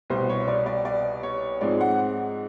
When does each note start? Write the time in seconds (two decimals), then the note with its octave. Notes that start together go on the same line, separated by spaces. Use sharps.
0.10 C2 B2 G3 C5
0.29 C#5
0.48 D5
0.66 D5
0.85 D5
1.23 C#5
1.61 G#2 F3 G#3 C4 D5
1.81 F#5